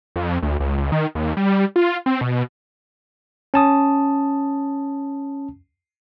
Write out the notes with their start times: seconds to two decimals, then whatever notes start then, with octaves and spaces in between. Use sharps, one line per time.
0.16 F2
0.42 D2
0.60 C#2
0.77 C#2
0.92 D#3
1.15 D#2
1.37 G3
1.76 F4
2.06 C4
2.21 B2
3.54 C#4 A5 D#6